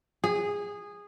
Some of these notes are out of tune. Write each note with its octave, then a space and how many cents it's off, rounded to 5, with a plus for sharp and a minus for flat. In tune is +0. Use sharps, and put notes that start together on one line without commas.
G#4 -15